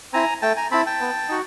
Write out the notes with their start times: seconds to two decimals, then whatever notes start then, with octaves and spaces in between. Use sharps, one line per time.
0.13 C4 E4 G#5 A#5
0.42 A3 G5 A5
0.56 G#5 A#5
0.71 C4 E4 A5 B5
0.86 G5 A5
1.01 B3
1.29 D#4 F#4